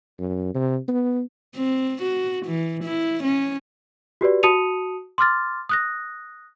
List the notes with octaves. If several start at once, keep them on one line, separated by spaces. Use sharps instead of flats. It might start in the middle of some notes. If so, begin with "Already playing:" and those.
F#2
C3
B3
C4
F#4
E3
E4
C#4
F#4 G4 B4 D5
F#4 A5 D#6 C#7 D#7 F7
C6 D6 F6 A6
D#6 F#6 A#6